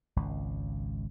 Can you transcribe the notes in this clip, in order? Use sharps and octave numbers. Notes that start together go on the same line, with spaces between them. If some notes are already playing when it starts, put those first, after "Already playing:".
G#1 C#2